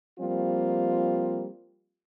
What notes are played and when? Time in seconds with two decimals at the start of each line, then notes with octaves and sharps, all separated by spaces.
0.19 F3 G3 A#3 C4 F4